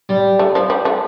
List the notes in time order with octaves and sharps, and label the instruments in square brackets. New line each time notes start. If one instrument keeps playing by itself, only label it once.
[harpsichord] G3
[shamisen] A3
F3
G3
A3